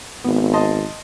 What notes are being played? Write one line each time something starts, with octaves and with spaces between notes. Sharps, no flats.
G#1 B3
D#5 A5 C6